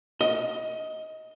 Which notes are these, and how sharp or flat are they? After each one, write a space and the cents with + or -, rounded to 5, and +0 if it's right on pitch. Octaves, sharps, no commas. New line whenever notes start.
D#5 +20